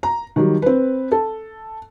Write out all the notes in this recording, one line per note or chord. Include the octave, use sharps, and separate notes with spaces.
A#5
D#3 F#3 G3
C4 B4
A4